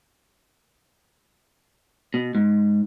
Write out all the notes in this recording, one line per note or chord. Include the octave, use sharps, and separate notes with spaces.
B2
G#2